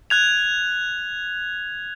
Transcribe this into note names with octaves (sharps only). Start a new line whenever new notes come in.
F#6 G#6 F7